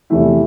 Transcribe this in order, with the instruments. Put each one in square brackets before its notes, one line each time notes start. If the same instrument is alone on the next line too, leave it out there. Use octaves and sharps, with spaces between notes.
[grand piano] E2 C3 E3 A3 E4